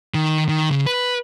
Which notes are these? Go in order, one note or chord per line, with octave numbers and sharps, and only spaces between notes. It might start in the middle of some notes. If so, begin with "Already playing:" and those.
D#3
D#3
C#3
B4